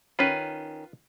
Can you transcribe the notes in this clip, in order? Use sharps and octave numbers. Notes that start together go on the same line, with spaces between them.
D#3 C#4 F4 B4 B5